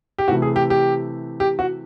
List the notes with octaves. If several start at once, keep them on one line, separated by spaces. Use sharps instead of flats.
G4
C3 E3 A3 F#4
G#4
G4
G4
G4
F#4